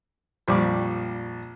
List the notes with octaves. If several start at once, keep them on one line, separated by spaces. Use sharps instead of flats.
A#1 F2 G3 D5 C#6 D6